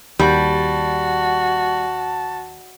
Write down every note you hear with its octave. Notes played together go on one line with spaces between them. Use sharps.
D#2 G3 F#4 A5